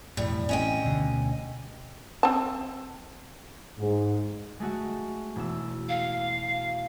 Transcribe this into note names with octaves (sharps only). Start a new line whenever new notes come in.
E1 F2 A2 G3
A1 E3 C4 C#4 D#5 G5
D2 B2 D3
C4 A5
G#2
G#3 A3 F#4
E1 E6
F5